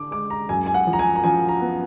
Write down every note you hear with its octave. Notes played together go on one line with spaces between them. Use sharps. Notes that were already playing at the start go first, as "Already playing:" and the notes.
Already playing: D3 D4 D6
G#3 D6
A#5
F#2 G#5
G#5
F#5
F3
A#5
G#5
A#5
F3 G#5
A#5
B3